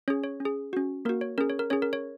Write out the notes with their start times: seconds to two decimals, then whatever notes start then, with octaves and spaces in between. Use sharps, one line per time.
0.08 C#4 C#5
0.10 G#4
0.24 C#5
0.40 C#4
0.45 G#4
0.73 C#4 F#4
1.05 A#3 A#4
1.09 F#4
1.21 C#5
1.38 C#4 G#4 A#4
1.49 C#5
1.59 A#4
1.70 C#4 G#4 C#5
1.82 A#4
1.93 C#5